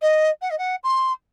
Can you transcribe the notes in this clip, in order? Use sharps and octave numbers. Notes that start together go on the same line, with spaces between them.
D#5
F#5
D#5
F#5
C6